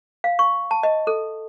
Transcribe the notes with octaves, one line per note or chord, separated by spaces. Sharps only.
F5
C#6
A5
D#5
A4